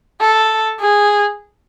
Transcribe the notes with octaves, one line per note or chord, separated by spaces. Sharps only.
A4
G#4